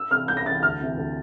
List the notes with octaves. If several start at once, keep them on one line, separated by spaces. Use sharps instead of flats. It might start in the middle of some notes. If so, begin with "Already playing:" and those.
Already playing: E6
C3 E3 F6
C2 G6
A#6
C3 E3 A6
D2 F6
C3 E3
D2